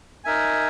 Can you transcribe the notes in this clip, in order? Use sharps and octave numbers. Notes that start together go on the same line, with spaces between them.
D#4 A#4 E5 G#5